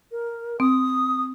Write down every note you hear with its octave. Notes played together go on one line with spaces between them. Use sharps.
A#4
C4 D#6